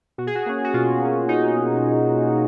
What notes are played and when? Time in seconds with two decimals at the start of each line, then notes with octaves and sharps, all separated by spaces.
0.18 B2 F#4
0.27 G#4
0.35 F#4
0.46 A#3 C#4
0.64 F#4
0.74 B2 F4
1.01 A#3 C#4
1.28 B2 D#4